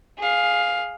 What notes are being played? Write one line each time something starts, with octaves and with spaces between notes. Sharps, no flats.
G#4 F5